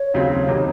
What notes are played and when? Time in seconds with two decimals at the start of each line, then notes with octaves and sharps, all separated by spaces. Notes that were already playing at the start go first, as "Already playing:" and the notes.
Already playing: C#5
0.14 D#2 C#3 F#3 C4 F4
0.49 C3 D#3